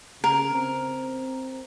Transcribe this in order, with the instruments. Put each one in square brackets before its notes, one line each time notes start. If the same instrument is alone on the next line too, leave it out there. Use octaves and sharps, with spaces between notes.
[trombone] C#3 [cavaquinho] A#4
[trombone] C4